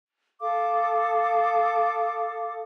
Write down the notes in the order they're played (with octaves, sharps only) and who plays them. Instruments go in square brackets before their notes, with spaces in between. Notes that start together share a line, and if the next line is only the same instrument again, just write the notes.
[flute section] A4 F5 D6 D#6